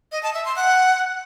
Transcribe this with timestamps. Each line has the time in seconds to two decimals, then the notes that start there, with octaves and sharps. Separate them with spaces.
0.12 D#5
0.23 A5
0.34 E5
0.45 C6
0.56 F#5